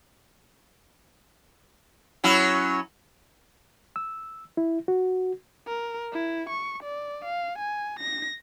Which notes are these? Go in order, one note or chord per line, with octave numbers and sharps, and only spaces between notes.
F#3 C#4 E4
E6
E4
F#4
A#4
E4
C#6
D5
F5
G#5
A#6